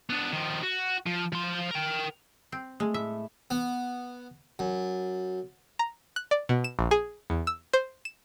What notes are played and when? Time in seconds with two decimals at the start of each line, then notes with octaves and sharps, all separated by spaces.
0.10 B3 D4
0.33 D#3 F3
0.63 F#4
1.06 F3
1.33 F3 C6
1.71 A#4 G5
2.52 C4
2.80 G#3 A3
2.94 A2 E5
3.51 B3
4.59 F#2
5.79 A#5
6.16 F#6
6.31 D5
6.49 B2
6.64 E7
6.79 A#1
6.91 G#4
7.30 E2
7.47 E6
7.73 C5
8.05 E7